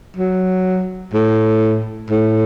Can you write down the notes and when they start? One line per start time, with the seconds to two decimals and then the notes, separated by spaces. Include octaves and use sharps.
0.17 F#3
1.14 A2
2.10 A2